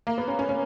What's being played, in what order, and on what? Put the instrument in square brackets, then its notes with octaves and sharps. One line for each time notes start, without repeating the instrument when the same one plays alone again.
[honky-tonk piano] A#3
B3
C#4
C#4
C#4